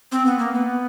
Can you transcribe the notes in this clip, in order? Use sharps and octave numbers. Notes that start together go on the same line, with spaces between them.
C4
B3
A#3
B3